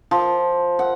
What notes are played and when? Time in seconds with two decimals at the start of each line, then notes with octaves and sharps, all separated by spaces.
0.11 F3
0.79 F#5